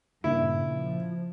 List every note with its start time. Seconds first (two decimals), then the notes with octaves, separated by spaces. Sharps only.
0.24 G2 A#2 C#3 A#3 E4
0.61 F3